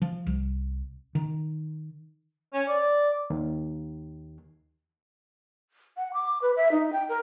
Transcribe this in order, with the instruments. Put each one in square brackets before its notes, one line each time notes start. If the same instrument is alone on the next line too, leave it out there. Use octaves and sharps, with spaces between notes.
[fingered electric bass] F3
C2
D#3
[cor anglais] C#4
D5
[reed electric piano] D#2
[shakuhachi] F#5
D6
B4
E5
D#4
G5
A#4